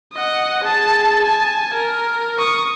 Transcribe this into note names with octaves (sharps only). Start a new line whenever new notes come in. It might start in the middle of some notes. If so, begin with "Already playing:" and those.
D#5 F#5
G#4 A5
G#5 A5
A#4
C#6 D#6